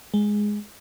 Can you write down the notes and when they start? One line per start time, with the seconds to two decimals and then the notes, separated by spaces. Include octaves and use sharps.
0.14 G#3